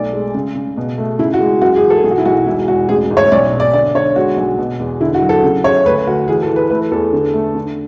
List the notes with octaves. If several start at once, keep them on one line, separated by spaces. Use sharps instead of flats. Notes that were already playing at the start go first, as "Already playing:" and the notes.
Already playing: B1 A3 D5
G#3
C#3
C#3
B2
A3
C#3 E4
F#4
G#3
F#2 F#4
G#4
E3
A4
B1 G#4
F#4
E4
B1 F#4
E1 E4
E1 F#4
A1 G#4
A1
C#5
B1 D5
B2
D5
D3 D5
D3 C#5
G#3 F#4
B1
B2
E2
D3 E4
F#4
F#3
A4
C#3
C#3 C#5
D2 B4
D2 F#4
E3 G#4
A4
E3
B4
A3 B4
E2 A4
D3
A3
D3